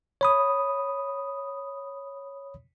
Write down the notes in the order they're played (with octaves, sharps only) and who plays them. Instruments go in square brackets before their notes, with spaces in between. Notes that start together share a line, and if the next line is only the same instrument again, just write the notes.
[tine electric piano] C#5 B5 D#6